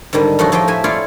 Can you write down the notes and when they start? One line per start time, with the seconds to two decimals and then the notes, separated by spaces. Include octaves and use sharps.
0.13 G#2 D3 D#3 G3
0.39 A2 F3 D#4 F#4
0.52 A2 F3 G4 D#5 G5
0.68 A2 E5 G#5
0.84 E4 F4 C#5 D5 F5